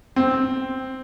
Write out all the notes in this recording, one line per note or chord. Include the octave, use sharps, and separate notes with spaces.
C4